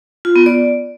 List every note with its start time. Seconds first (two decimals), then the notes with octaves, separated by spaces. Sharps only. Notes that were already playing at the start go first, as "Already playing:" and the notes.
0.25 F4
0.36 B3
0.46 D5